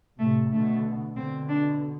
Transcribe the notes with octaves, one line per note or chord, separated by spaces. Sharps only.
A2 C3 A3
B2 D3 A3
B2 D3 C4
D4